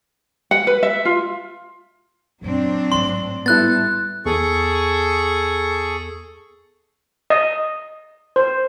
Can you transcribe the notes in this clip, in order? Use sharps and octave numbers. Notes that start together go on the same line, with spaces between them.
F#5
B4
E5
F4
F#2 A#2 F#3 C4 D4
G#1 A2 C6
G3 B3 E4 A4 F#6 A6
E2 G#4 A4 C#6
D#5
C5